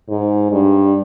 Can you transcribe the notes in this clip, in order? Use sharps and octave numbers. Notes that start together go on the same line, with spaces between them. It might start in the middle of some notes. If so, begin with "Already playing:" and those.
G#2
G2